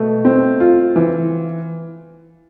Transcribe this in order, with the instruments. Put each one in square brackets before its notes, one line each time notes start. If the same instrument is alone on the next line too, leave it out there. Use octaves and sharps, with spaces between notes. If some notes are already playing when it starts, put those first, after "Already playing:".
Already playing: [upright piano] B2 A3
C4
F4
E3